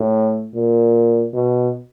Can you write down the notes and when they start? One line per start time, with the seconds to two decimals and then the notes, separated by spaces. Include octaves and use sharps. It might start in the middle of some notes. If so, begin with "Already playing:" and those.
Already playing: A2
0.54 A#2
1.33 B2